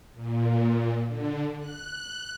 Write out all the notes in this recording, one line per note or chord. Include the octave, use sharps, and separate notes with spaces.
A#2
D3
F#6